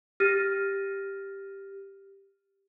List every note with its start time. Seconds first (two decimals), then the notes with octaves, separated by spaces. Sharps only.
0.20 G4 F6 A6 A#6 D#7